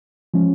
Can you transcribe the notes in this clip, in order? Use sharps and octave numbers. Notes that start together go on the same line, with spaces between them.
F3 G#3 C#4